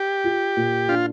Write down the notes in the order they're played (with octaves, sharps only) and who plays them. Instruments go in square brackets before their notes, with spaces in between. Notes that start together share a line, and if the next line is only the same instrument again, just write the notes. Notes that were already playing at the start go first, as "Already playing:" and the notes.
Already playing: [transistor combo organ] G4
[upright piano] F4
A#2
[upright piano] D4 [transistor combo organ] F4